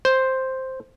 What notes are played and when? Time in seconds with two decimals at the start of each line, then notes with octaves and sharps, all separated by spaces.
0.05 C5